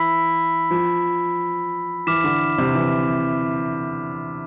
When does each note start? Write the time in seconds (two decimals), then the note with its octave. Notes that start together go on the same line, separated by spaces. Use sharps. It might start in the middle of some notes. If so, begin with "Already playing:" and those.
Already playing: E3 B5 E6 B6
0.71 F3
2.07 E3 D6 F6 B6 E7
2.24 D3
2.58 C3
2.75 E3